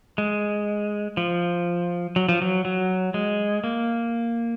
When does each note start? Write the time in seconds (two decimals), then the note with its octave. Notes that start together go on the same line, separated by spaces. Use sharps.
0.18 G#3
1.17 F3
2.16 F#3
2.29 F3
2.42 F#3
2.65 F#3
3.14 G#3
3.64 A#3